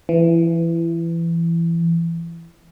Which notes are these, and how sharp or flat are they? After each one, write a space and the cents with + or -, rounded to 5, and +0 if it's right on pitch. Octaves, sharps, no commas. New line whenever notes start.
E3 +20